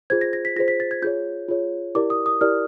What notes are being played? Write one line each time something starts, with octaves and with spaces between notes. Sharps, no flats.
F4 G#4 C5 G#6
A#6
A#6
B6
F4 G#4 C5 A#6
B6
A6
G#6
F4 G#4 C#5 G6
F4 G#4 C#5
E4 G4 A#4 D5 D6
D#6
D#6
E4 G4 A#4 D5 F6